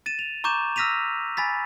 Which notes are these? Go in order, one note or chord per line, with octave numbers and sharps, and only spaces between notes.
A6 D#7 E7
F7
A#5 C#6 D6 G6 E7
E6 F6 A#6 B6 D#7 F7
G#5 B5 A6 B6